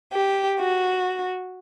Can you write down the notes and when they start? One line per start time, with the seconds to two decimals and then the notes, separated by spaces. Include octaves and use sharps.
0.15 G4
0.60 F#4